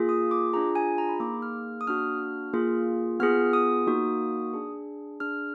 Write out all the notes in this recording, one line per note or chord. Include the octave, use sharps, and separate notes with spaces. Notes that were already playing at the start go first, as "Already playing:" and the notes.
Already playing: A#3 F4 G#4
D#6
D6
D4 F4 G#4 A#5
G#5
A#5
B5
A#3 D#4 G#4 D6
F6
D#6
A#3 D4 F#4 F6
A#3 F4 G#4
B3 F4 G#4 F6
D#6
A#3 D#4 F#4
D4 G#4
D4 G#4 F6